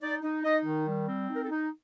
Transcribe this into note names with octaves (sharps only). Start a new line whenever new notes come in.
D#4 D5
D#4
D#4 D#5
D#3
G3
C4
D#4
A#4
A4
D#4